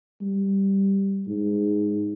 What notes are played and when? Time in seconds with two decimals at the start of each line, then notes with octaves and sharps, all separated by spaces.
0.21 G3
1.27 G#2